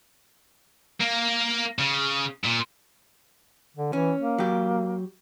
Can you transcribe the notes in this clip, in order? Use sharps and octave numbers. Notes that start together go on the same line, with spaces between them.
A#3
C#3
A#2
D3
E3 C#4
A#3
F#3 G4